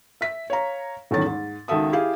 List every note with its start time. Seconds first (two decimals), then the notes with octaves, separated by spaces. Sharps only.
0.21 E5 B6
0.50 C#5 F5 A#5
1.11 D#1 E2 A2 D#3 C#4 A6
1.26 G#2
1.68 C#2 D#3 F#4 A4 E5 D#6
1.93 E4 G4 G#4 F5